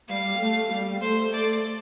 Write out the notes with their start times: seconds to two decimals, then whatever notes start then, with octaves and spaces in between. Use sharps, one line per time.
0.08 G3 F5
0.39 A3
0.71 G3
1.01 A3 C5
1.32 D5